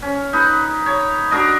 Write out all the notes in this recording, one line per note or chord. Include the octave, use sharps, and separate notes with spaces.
C#4
D#4 B4
C#5
D4 F#4 A#4 D#5